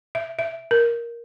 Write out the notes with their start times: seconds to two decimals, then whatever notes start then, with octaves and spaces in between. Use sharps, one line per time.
0.15 E5
0.39 E5
0.71 A#4